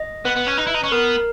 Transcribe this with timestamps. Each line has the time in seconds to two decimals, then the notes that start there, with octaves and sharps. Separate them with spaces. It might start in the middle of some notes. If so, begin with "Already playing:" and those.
Already playing: D#5
0.25 B3 B4
0.37 B3
0.48 C#4
0.58 D#4
0.67 E4
0.75 D#4
0.84 C#4
0.92 B3 A#4